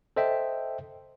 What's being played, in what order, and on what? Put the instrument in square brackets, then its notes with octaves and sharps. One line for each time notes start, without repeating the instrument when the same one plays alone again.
[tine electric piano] A4 C5 D#5 E5 G5